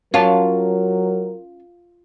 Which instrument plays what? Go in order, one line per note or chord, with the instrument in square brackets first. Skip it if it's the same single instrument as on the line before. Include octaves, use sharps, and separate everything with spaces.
[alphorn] F#3 [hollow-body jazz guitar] C#4 C#5 A5 [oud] F4 [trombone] A#4